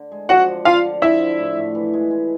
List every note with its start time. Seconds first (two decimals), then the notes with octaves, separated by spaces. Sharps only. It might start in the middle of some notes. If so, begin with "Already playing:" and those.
Already playing: D3
0.12 G#3
0.29 F3 F#4 F#5
0.48 D3
0.65 D3 F4 F5
0.85 D3
1.02 F3 E4 E5
1.20 D3
1.39 A2
1.57 A2
1.75 E3
1.93 G#3
2.11 G#3